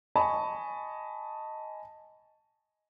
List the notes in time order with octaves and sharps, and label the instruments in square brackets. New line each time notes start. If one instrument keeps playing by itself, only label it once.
[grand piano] D#5 G#5 A5 B5 C#6